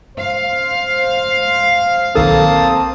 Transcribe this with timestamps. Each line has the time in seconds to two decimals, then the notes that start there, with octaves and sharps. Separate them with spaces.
0.17 C5 F5
2.16 B1 D#3 A#3 C4 A4 A5 D#6